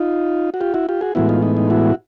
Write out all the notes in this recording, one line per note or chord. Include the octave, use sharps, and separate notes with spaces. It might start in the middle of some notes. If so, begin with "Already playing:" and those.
Already playing: D#4 F4
F#4
F4 G4
E4 F#4
F4 G4
F#4 G#4
A2 E3 G#3 B3 E4 F#4
D#4 F4
D#4
D#4
E4 F#4